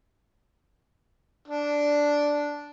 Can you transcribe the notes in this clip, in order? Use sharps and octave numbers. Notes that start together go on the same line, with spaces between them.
D4